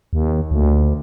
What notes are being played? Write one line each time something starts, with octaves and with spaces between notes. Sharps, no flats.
D#2
D2